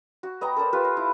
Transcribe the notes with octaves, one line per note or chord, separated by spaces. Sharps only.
F#4
B3 D#5 G5 A#5
A4 A#4 C5 D5
F4 G4 B4
D#5
E4